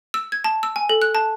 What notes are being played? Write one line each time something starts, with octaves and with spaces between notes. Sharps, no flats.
E6
G#6
A5
E6
G#5
A4
F#6
A5